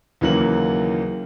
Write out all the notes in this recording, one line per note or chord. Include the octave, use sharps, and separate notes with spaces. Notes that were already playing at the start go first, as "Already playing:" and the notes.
D#2 C#3 E3 F#3 A#3 F#7